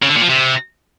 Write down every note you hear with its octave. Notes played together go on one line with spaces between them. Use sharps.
C#3
D3
A#2
F3
C3